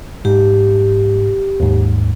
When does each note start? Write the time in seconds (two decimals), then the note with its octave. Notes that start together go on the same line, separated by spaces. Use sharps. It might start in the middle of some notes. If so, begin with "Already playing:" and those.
0.25 G#2 G4
1.60 D#2 G#2